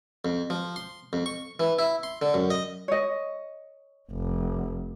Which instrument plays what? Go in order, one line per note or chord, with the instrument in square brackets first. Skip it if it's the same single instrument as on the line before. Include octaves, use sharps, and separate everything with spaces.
[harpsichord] F2
F3
C6
F2
C#6
E3
E4
C6
D3
F#2
D#5
[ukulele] C#5 D#5
[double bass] F1